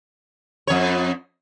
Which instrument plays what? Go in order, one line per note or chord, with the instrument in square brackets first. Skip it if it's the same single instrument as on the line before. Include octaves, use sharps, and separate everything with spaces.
[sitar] F2 C#5